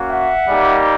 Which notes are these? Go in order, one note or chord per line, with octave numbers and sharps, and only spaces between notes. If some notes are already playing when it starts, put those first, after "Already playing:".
Already playing: A#3 C#4 F#4
E5 F#5
G3 A#3 D#4 G4